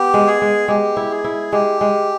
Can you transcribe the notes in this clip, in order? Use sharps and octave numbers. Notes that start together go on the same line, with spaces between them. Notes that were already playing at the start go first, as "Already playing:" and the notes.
Already playing: B3 G4
G#3
G#4
G#3
G#3 G4
E4
G#4
E4
G#3 G4
G#3